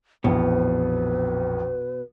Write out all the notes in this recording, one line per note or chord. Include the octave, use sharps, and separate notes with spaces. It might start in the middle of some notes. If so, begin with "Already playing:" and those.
A#1 F2 B2 E3 B3 B4